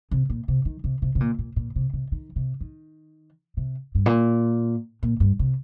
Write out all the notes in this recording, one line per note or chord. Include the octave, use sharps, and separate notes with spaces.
C3
A#2
C3
D#3
C3
C3
C3
A#2
A#2
A#2
C3
C3
D#3
C3
D#3
C3
G2
A#2
A#2
G2
C3